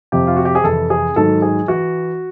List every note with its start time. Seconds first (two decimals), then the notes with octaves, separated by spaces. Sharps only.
0.12 F2 C3 F3 G4
0.27 F4
0.36 F#4
0.45 G4
0.55 G#4
0.64 F2 C3 E3 A4
0.90 G#4
1.16 G#2 D#3 F#3 A4
1.42 G#4
1.68 E3 F#4